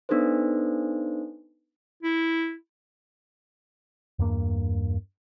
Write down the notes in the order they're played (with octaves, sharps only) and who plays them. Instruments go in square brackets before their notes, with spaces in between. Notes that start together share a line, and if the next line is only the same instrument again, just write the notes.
[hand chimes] B3 D4 D#4 A4 B4 C5
[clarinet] E4
[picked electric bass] E2 G2 A#3